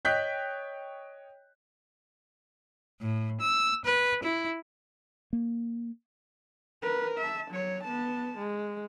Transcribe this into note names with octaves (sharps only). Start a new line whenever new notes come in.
C#5 D#5 G5 F#6 G6 B6
A2
E6
B4
E4
A#3
A#4 B4
E5 A5
F#3 C#5
B3 A5
G#3